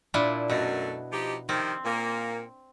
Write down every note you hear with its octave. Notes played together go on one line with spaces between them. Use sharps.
A#2 D4 E4
F#2 B2 A3
F3 D#4 G4
C3 D#3 F3 C4
A#2 A#3